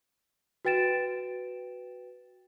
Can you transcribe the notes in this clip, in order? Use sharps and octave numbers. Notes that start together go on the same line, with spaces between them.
F#4 B4 G5 A6 D7 E7